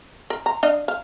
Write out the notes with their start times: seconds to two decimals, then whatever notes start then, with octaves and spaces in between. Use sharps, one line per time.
0.30 A#4
0.46 A#5
0.63 D4 D#5 F5
0.88 F5